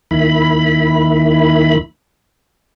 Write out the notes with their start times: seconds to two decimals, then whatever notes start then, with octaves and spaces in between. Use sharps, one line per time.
0.11 D#2 D#3 E4 B5